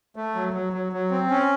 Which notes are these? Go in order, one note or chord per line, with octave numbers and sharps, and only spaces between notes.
A3
F#3
F#3
F#3
F#3
C4
C#4